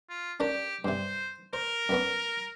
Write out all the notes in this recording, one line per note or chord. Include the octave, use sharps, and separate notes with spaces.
F4
C#4 D4 G4 A#4
G2 C3 C5
A#4 C5
F#2 B3 C#4